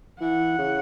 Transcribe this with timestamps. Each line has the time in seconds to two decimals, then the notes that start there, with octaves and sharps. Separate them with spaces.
0.21 E3 F#5
0.58 C#3